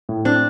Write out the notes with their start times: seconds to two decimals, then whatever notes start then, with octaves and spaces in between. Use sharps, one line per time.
0.09 A2
0.25 C4 D4